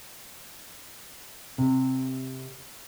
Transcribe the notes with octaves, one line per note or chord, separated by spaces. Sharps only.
C3